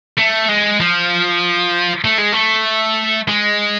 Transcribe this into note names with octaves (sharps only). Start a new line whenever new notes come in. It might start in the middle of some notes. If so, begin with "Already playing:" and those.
A3
G#3
F3
A3
G#3
A3
G#3